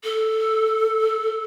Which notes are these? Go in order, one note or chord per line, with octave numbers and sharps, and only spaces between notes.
A4